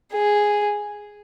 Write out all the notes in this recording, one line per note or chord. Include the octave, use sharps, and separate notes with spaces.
G#4